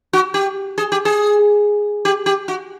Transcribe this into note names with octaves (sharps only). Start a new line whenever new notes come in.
F#4
G4
G#4
G4
G#4
G4
G4
F#4